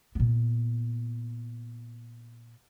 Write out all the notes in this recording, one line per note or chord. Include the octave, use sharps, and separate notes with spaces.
A#2 B3